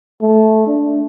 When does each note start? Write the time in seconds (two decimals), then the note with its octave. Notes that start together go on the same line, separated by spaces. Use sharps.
0.22 A3
0.67 D4